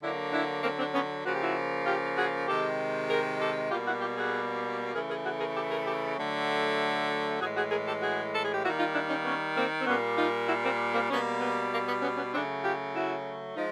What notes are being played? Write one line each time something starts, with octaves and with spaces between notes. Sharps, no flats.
D3 F#3 A#3 D4 E4
D4 E4
A#3 C4
C4 D4
B3 C#4
C#3 F3 A#3 F#4
G4
E4 F#4
F4 G4
F#4 G#4
C3 D#3 G#3 G4 A4
G#4 A#4
G4 A4
B2 G3 A#3 F4 G4
E4 F#4
F4 G4
F#4 G#4
C#3 E3 A3 G#4 A#4
G#4 A#4
F#4 G#4
G#4 A#4
G4 A4
G#4 A#4
G4 A4
D3 F#3 A3
A2 E3 G#3 F#4 G#4
F#4 G#4
G#4 A#4
G4 A4
F#4 G#4
A4
G#4
G4
D#3 G3 A#3 E4 F#4
D#4 F4
D4 E4
C#4 D#4
B3 C#4
A#3 C4
C4
A#2 G3 A#3 B3 C#4
D#4 F4
E4 F#4
A#3 C4
A#3 C4
B2 G3 A#3 B3 C#4
B3
A#3
B3
B3 C#4
B3 C#4
C#3 F#3 A3 C4 D4
F4 G4
E4 F#4
F3 G#3 D#4 F4